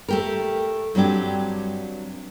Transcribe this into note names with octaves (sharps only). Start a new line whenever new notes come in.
A3 G4 A#4
G2 F#3 C4 D4 G4